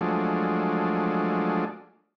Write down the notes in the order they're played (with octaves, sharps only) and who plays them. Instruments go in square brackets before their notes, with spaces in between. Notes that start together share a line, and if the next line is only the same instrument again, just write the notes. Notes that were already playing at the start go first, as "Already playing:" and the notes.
[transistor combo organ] F3 F#3 G#3 A3 D4